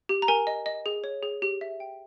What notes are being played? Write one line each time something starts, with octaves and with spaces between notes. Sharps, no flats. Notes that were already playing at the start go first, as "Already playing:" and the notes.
G4
A#5
A#4 G#5
D#5
D#5
G#4
C#5
G#4
G4
E5
G5